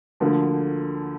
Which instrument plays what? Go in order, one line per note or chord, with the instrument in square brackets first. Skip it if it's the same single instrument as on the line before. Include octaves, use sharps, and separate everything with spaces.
[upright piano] D2 D3 F3 A#3